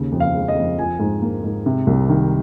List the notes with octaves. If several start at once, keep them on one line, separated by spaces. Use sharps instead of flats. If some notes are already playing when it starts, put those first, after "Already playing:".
Already playing: D#2 C#3
F2
F5
G#3
D#5
F2
F3 G#5
G#2
A#3
G#2
C3
C2
D#3